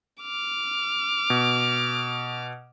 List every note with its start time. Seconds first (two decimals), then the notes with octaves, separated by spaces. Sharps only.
0.22 D6 F6
1.30 B2